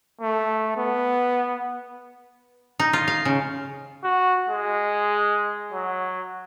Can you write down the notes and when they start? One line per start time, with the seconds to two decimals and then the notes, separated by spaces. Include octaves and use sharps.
0.21 A3
0.77 B3
2.80 D#4
2.93 F4
3.08 F5
3.25 C#3
4.04 F#4
4.49 G#3
5.72 F#3